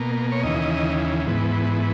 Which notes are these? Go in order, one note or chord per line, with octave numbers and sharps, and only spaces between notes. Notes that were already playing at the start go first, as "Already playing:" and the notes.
Already playing: B2 A#3
C#5
D#2 C#3 E3 D#5
G#2 E3 B3